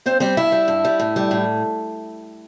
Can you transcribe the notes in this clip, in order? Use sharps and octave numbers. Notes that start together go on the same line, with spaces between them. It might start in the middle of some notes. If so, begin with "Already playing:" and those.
G2 C4 C5
G3 C4 C5
G2 E4 E5
G3
G2
G3
A2
G3
A2